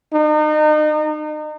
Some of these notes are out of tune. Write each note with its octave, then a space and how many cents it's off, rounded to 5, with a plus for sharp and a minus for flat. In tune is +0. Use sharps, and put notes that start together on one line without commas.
D#4 -35